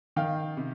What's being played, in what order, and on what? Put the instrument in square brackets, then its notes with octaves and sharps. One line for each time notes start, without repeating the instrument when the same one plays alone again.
[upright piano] D#3 F5 G5
C3